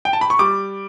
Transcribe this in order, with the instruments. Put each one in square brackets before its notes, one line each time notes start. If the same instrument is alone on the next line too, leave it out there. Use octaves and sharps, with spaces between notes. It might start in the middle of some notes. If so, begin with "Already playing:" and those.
[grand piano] G5
A5
B5
C#6
G3 D6